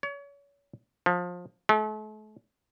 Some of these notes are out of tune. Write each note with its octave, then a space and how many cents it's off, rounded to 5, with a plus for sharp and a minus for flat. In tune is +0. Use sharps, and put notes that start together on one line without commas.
C#5 +35
F3 +25
A3 -40